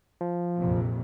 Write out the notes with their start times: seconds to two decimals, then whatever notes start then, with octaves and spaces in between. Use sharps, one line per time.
0.21 F3
0.57 A#1 F2 C3